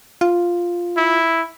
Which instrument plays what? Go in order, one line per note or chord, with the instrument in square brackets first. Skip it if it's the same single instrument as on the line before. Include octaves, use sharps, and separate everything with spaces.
[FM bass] F4
[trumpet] E4